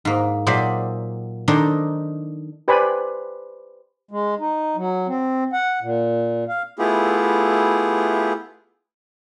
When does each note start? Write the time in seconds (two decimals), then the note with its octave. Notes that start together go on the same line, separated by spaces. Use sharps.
0.05 G#2 A#3
0.47 A#2 F#3 G#4 C5 D5 E5
1.48 D#3 D4 D#4 A4 A#4 C5
2.68 G4 B4 C5 D5 G#5 B5
4.11 G#3
4.40 D#4
4.77 F#3
5.07 C4
5.53 F#5
5.82 A#2
6.49 F5
6.78 A3 B3 E4 F4 G4 G#4